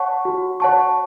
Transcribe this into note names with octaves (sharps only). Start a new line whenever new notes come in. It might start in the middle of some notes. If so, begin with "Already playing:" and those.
Already playing: C#5 F#5 A5 C#6
F#4
C#5 F#5 A5 C#6